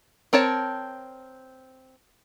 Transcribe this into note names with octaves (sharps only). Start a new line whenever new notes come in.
C4 A#4 C#5 A5